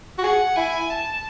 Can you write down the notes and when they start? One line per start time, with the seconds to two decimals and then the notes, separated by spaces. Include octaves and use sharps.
0.18 F#4
0.23 G#4 F#5
0.56 E4 G#5
0.90 A5